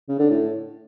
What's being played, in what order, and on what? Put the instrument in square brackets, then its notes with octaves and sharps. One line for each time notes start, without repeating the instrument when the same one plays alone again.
[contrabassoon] C#3
D3
A2